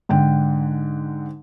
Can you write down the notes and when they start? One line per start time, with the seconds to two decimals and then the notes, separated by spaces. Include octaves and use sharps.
0.09 G#2 D3 G5